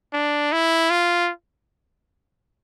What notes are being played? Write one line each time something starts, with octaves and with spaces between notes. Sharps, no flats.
D4
E4
F4